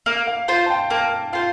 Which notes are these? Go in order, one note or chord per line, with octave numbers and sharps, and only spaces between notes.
A#3 F5
F5
F4 C5 F5
A5
G5
A#3 A5
F4 C5 F5